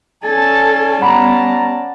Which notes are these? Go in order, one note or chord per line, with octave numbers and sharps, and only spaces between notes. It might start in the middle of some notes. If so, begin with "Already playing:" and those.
C#4 A4 D5 G#5 A5 A6
G3 B3 F#5 A#5 B5 D6